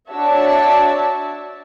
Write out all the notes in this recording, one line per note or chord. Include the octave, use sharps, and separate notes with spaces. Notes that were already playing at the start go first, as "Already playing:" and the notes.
D4 F#4 C#5 D5 E5 A5